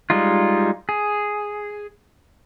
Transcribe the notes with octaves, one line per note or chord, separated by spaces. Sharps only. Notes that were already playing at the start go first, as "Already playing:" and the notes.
G3 G#3 D#4 F4
G#4